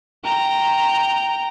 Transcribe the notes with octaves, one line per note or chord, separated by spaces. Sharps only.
G5 A#5